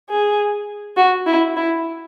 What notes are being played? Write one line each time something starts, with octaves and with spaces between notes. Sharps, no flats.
G#4
F#4
E4
E4